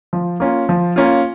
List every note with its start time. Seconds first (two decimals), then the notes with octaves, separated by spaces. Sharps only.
0.13 F3
0.40 A#3 C#4 F4
0.69 F3
0.96 A#3 C#4 F4